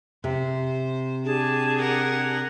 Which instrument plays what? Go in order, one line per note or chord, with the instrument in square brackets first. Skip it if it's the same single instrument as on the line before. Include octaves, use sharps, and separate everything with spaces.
[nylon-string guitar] C3 [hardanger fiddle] C5
[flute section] D4 G4 G#4 [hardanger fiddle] A5
[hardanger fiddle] A#4 F#5